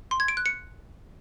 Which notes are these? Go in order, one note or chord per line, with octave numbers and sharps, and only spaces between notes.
C6
G#6
D7
F#6
C#7